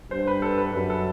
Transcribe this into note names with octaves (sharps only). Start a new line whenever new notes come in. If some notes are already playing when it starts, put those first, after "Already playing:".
G2 C5
B4
A4
B4
F#2 B4
A4